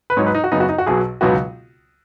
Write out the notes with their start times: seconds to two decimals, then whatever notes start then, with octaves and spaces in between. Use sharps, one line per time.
0.10 B4
0.17 G#2 F#3 D#4 C#5
0.26 B4
0.35 D#4
0.44 F#4
0.51 F#2 C#3 B3 D#4
0.60 F#4
0.69 D#4
0.78 F#4
0.86 B1 B2 F#3 G#4
1.21 C#2 B2 F#3 B3 D#4 F#4